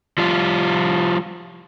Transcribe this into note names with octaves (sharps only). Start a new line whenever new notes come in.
F3 G3 F4